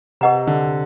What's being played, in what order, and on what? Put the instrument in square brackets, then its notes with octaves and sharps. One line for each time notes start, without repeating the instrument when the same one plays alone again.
[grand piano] C3 [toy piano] G4 B4 D#5 F#5 A#5
[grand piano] D3